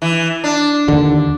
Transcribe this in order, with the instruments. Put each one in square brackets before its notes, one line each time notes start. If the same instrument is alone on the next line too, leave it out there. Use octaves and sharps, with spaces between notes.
[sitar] E3
D4
[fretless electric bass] D#2 D3